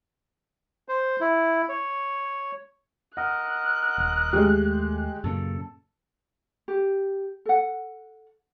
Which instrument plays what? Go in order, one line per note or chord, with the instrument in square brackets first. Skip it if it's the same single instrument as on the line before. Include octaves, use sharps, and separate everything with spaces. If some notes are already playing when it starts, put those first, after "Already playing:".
[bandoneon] C5
E4
C#5
[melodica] A#4 D#5 [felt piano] F#5 [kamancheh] F#6
[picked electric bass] D#1
[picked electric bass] D#2 A3 [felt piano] G#3 G4
[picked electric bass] F#2 A#2 C#3 [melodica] A4
[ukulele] G4
A4 F#5